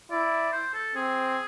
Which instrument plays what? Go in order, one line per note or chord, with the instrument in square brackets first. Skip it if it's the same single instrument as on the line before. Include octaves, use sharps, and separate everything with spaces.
[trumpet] E4 [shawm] D5
[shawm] C5
A4
[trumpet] C4 [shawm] G#4